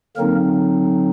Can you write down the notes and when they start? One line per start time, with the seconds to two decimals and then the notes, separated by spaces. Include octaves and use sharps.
0.17 D3 F#3 A#3 C4 D#4 A#4